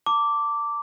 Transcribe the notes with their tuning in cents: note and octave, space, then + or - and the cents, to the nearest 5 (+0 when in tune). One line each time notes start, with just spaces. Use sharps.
A5 +40 D6 -10